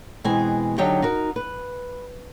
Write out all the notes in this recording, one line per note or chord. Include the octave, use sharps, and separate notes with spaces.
B2 E3 G#3 C4 G#5
D3 F#3 D#4 G4 C#5 G5
D#4 F#4 A#4
B4